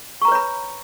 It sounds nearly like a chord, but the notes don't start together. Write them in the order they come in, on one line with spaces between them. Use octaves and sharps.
C#6 A#5 B4 C#5 B5